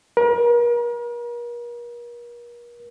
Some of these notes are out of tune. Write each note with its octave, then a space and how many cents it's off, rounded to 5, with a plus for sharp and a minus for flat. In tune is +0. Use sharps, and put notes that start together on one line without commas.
A#4 +40